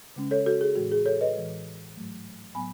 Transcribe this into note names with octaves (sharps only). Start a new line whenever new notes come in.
C#3 G#3 C#4
A4 C#5
F#4 A4
G#4
A2 E3 G#3 F#4
G#4
A4 C#5
B4 D#5
A2 E3 G#3
G#2 F#3 A3
A2 F#3 B3 G#5 B5